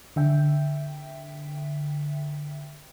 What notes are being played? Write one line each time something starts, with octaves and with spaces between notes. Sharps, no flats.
D3 E5 G5